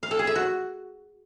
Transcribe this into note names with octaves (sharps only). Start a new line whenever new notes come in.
F5
A4
G#4
E5
F#4